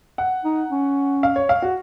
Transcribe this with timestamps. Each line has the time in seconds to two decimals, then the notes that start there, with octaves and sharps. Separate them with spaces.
0.18 F#5
0.45 D#4
0.71 C#4
1.23 F5
1.36 C#5
1.49 F5
1.62 F#4